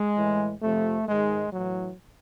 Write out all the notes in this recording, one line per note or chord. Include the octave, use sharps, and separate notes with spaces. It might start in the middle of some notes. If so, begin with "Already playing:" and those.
Already playing: G#3
A2 E3
F2 C3 F3 A3
G#2 D#3 G#3
A2 E3 F#3